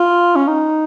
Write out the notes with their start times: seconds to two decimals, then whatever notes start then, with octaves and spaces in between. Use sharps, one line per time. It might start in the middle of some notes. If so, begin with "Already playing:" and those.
Already playing: F4
0.36 C#4
0.48 D#4